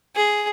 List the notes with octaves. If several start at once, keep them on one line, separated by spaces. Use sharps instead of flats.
G#4